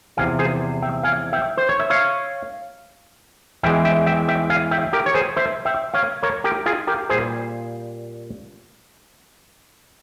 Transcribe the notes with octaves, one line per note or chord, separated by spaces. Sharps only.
E2 C3 F3 F5 G#5
G#4 C5
E5 G5
F5 G#5
E5 G5
C5
C#5
E5
C#5 F5
E2 E3 G#3 E5 G5
E5 G5
E5 G5
E5 G5
F5 G#5
E5 G5
G4 A#4
C#5
G#4 C5
C5 E5
E5 G5
C#5 F5
A#4 C#5
G4 A#4
F4 G#4
G4 A#4
A#2 G3 G#4 C5